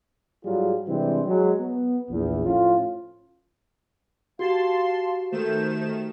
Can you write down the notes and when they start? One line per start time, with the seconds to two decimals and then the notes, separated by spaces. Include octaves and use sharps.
0.45 G#2 F#3 G3 F4 F#4 G#4
0.88 C3 E3 G3 G#3 C4 D4
1.26 F#3 G#3
1.60 B3
2.10 A#1 E2
2.44 A2 F3 C#4 F4
4.39 F#4 G4 F5 A5 C6
5.32 D#3 A3 C5 E7